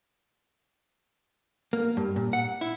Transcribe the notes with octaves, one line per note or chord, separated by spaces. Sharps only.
A#3
G2
A#2
F#5
E4